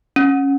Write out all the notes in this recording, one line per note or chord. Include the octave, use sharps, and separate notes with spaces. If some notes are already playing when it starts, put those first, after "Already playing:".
C#4